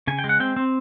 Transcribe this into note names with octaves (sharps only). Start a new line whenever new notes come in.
C#3 G#5
G5
G#3
F#5
C4 G5
C4